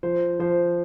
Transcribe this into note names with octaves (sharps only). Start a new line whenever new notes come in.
F3 C5
F3 C5